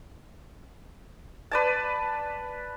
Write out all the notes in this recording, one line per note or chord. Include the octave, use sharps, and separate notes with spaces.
B4 D5 A5